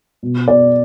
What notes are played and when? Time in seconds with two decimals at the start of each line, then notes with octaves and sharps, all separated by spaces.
0.23 B2
0.48 B2 D5